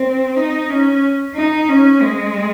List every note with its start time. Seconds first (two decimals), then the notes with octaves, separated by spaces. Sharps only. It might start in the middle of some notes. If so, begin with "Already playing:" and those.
Already playing: C4
0.37 D#4
0.70 C#4
1.35 D#4
1.69 C#4
2.02 G#3